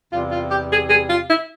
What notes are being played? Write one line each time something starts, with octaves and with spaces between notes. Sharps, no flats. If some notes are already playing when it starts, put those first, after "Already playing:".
E2 C3 G3 F4
F4
G4
G#4
G#4
F4
E4